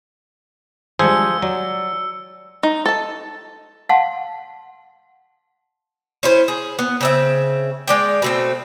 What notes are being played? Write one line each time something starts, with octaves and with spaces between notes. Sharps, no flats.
F3 G3 G#3 D4 G#4 C5 E6 C#7
F#3 D5
D#4
A4 A5
F5 F#5 A5 C6
C#4 E4 C5
G#4
B3
C#3 C4 E5
G#3 D5 G5
B2 A3 C4